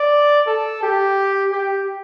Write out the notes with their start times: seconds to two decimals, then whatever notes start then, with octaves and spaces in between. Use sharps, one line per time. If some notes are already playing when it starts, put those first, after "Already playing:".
Already playing: D5
0.47 A4
0.83 G4
1.52 G4